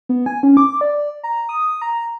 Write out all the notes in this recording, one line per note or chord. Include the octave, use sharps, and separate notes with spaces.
B3
G#5
C#4
D6
D5
A#5
D#6
A#5